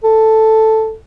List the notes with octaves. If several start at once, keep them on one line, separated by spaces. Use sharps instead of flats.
A4